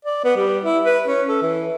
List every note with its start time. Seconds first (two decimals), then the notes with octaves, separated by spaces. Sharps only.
0.05 D5
0.24 B3
0.36 G3
0.64 E4
0.85 B4
1.07 C#4
1.29 A4
1.42 E3